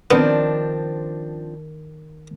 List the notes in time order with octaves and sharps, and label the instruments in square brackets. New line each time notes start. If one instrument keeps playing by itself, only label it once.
[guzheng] D#3 [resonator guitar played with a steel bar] F3 C4 D4 [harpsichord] B3